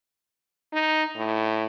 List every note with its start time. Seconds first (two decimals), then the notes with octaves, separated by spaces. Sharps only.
0.73 D#4
1.16 A2